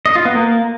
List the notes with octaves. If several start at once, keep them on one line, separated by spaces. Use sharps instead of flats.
D#5
F4
B3
A#3